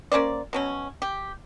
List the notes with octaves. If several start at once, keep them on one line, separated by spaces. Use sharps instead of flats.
A#3 C#4 C5 D5
B2 F#3 C#4
G4